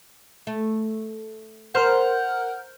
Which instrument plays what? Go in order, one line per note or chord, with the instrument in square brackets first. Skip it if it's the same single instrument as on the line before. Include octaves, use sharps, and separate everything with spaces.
[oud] A3
[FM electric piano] A#4 F6 G6 [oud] C5 [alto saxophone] F#5